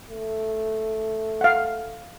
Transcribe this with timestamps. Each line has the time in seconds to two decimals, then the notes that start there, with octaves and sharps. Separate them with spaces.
0.10 A3
1.41 F5 F#5